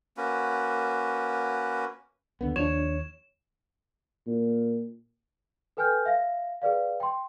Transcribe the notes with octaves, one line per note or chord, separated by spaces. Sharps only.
A#3 C#4 F#4 B4
D#2 D3 B3
D#2 F3 D4 C#5 E7
A#2
A4 B4 G5 G#5 F6 G6
E5 F5 A#6
G#4 B4 D5 F5
G5 C6